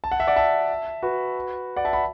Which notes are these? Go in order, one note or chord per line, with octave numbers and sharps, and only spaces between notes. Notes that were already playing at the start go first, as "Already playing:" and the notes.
A5
F#5
E5
D5 F#5
E5 A5
F#4 B4
D5 F#5
E5 A5
F#5 B5